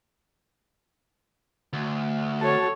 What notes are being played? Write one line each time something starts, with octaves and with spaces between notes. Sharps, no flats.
D2
F#4 A4 C#5 A5